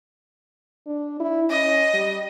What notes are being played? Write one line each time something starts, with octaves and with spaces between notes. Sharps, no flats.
D4
E4
C#4 D#5
G3